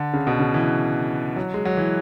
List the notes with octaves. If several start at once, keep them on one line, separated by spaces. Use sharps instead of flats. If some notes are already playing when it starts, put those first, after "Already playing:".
Already playing: D3
C#3
B2
C#3
E3
F#3
G#3
F#3
E3